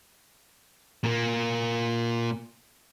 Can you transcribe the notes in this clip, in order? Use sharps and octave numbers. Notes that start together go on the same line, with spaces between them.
A#2 A#3